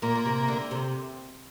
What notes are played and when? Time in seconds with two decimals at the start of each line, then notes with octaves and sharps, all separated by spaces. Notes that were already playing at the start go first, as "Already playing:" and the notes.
0.02 A#2 A#3
0.15 A#2
0.25 C3
0.48 D3
0.71 C3